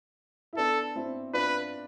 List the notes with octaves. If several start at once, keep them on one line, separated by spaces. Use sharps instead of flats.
E4
B3 D4 A4
C4 E4
D4 F4 B4